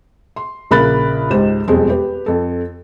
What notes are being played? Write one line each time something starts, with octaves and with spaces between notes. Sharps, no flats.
C6
A#1 C#3 A#4 B5 F#6 A6
C#2 G#2 G4 C5 E7
E1 F2 G3 G#3 C4
G4 B4
F2 A4